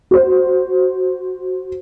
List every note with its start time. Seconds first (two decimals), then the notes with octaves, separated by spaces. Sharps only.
0.11 F#4 C5